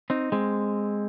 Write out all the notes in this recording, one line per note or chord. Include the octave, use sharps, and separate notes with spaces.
C4 D#4
G#3 C4